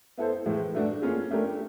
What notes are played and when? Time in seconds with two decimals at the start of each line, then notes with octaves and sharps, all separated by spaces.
0.17 B3 E4 A4 C5
0.46 A2 E3 G#3
0.74 F#3 A3 D4 F#4
1.02 A#3 C#4 F4 G#4
1.31 A3 D4 G4 A#4